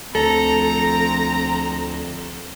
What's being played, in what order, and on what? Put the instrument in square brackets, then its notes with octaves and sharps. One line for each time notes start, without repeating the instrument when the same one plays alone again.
[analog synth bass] D2 [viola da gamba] F3 C4 [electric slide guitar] A4 [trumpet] A#5